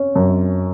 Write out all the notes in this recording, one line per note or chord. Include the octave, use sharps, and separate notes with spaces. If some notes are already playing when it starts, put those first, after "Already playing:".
Already playing: C#4
F#2